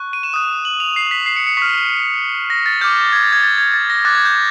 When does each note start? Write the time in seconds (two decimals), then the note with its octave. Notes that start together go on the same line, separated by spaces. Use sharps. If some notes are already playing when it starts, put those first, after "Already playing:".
Already playing: C#6 F#6
0.13 D#7
0.23 E7
0.34 D#6 F#6
0.65 F#7
0.80 F7
0.96 C7
1.11 B6
1.26 C7
1.36 C#7
1.47 C#7
1.57 C#6 F6 B6
2.50 A#6
2.66 A6
2.81 D6 F6 G6
3.13 G#6
3.23 A6
3.33 G#6
3.43 A6
3.58 G#6
3.74 A6
3.90 A#6
4.05 D6 F#6 A6
4.15 G#6
4.25 G6